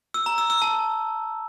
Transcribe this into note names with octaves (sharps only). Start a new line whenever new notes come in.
E6
A#5
E6
E6
A5